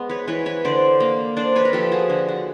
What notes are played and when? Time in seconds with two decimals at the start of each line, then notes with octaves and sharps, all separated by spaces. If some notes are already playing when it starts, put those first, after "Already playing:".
Already playing: G#3 B3
0.09 B4 C#5
0.27 E3 B4 C#5
0.46 B4 C#5
0.65 D3 C5 D5
1.00 A#3
1.37 D4 C5 D5
1.56 B4 C#5
1.65 A#4
1.73 F3 G4 A4
1.92 F#4 G#4
2.09 D3 F#4
2.28 F#4